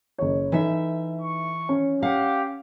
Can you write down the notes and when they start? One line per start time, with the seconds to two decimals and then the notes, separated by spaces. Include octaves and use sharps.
0.18 F#1 C#5
0.52 E3 D#4 A4 E5
1.21 C#6
1.69 C#4
2.03 G4 F5 F#5